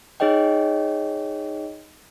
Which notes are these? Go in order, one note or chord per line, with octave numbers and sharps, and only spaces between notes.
D#4 G#4 C#5 D#5 G5